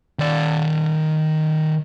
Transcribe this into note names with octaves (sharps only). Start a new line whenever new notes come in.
D#3 D5